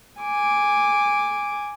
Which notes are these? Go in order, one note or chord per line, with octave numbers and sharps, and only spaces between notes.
G#5 D6